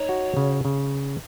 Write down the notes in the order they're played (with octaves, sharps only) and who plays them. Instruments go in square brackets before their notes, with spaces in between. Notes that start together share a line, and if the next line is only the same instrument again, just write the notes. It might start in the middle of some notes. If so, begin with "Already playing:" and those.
Already playing: [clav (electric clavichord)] D#4 [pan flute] C#5
[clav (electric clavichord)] F#4
C#3
C#3